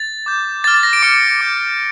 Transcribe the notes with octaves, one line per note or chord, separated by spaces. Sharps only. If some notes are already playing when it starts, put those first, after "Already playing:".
Already playing: A6
D6 G6
D6 F6 A6
A6
A#6
D7
D6 F6 C#7
D6 G6